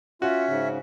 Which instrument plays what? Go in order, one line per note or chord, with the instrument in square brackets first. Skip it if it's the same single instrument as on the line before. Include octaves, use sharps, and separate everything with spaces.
[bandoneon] C#4 [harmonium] F4 [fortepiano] F#4 [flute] E5
[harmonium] G#2 C#3